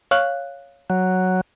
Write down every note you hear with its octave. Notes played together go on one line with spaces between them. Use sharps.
C#5 F5 F#6
F#3